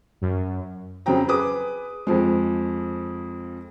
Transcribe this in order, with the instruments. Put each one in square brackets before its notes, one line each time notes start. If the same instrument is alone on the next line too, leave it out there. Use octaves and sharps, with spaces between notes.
[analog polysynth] F#2
[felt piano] F2 C#3 F#3 C4 G5 A#5
G#4 B4 D6 D#6
F2 F3 G#3